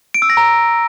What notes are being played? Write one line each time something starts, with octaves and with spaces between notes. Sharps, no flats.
D7
E6
A#6
A#5